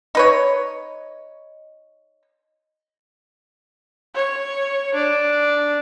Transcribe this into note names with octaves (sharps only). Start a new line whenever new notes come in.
D#4 B4 C#5
C#5
D4